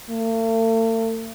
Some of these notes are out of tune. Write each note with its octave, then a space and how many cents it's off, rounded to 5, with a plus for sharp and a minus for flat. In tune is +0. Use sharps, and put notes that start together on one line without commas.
A3 +45